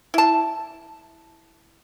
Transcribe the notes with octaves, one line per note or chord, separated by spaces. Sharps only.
E4 A5